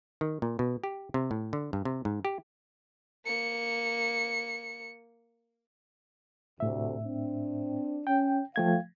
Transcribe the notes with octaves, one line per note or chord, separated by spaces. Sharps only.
D#3
A#2
B2
G4
C3
A2
D3
G2
C3
G#2
G4
A#3 C#7
D2 A2 C3 E5
C4 D4
C#4 G5
F3 A3 F5 G5 G#6